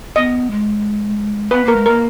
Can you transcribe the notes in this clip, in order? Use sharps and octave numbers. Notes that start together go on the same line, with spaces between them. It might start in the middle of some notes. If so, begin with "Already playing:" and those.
B3 D#5
G#3
B3 B4
A#3 A#4
G#3
A#3 A#4